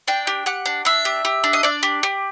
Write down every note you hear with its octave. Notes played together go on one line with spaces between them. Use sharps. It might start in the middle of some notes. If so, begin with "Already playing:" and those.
D4 G5
G4
G4 F#5
D4
D4 E5
G4
G4
D4
D#5
D4 D5
G4
G4